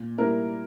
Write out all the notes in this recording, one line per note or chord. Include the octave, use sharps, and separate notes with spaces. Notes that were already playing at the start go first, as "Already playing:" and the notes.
Already playing: A#2
G3 A#3 E4 A#4